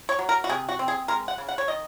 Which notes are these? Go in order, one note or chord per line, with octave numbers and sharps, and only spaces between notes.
C#5
F#3
A#4
F#4
C3 G#4
F#4
C4
G#4
G#3 A#4
F#5
C#3
F#5
C#5
D#3 D#5